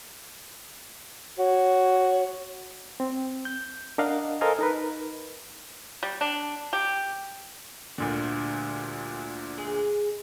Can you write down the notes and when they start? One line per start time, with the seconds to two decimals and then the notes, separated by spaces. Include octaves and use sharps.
1.38 F#4 C#5
3.00 C4
3.45 G6
3.98 D4 A#4 D#5 F5 F#5
4.41 A4 A#4 C5 D#5 F5 G#5
4.59 D#4 A#4 B4
6.03 G3
6.21 D4
6.73 G4
7.98 D2 A#2 D3 G3
9.58 G#3 G#4